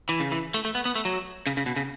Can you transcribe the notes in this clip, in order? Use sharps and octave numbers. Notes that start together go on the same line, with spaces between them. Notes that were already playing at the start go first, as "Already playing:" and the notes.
E3
C#3
E3
A3
A3
B3
B3
A3
F#3
C#3
C#3
B2
C#3